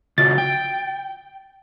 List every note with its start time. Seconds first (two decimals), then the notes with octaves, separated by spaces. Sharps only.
0.18 C#3 F4 F#4 A6
0.38 G5